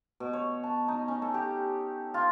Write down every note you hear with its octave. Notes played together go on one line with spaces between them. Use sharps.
B2
C#5
A5
D#4
C#4
A4
G4
F4